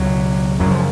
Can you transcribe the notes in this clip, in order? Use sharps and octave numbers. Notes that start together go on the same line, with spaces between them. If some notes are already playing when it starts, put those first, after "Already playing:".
Already playing: C#2 B2 F#3
F#2 C#3 F#3
F3